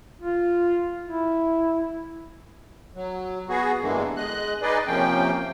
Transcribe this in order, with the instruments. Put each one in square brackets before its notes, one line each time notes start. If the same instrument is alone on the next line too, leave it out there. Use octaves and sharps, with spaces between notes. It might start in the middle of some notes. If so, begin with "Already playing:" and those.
[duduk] F4
E4
[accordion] F#3
B3 F#4 G#4
E2 G2 D3 E3 G#3 A#3
G#3 D#5 F#6
D#4 G#4 B4 D5 D#5
C3 F3 A#3 C#4 G5